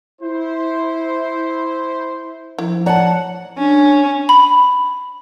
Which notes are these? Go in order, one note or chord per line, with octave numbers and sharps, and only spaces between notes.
E4 C5
F3 E4
C#5 D5 F#5 A5 A#5
C#4 D4
B5